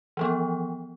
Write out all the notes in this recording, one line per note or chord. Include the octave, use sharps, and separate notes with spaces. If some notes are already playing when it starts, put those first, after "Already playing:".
E3 F3 B3